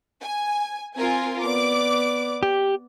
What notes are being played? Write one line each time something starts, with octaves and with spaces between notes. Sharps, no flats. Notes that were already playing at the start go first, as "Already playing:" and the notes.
G#5
C4 F4 A#4 G#5
B3 D5 D6
G4